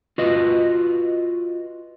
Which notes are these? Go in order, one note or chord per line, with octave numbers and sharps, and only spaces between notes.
F4 F#4 B4 D#5